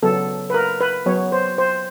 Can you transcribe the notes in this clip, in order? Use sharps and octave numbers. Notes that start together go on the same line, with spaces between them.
C#3 F#3 B3 A4
B4
A#4
B4
F#3 B3 C#5
C5
C5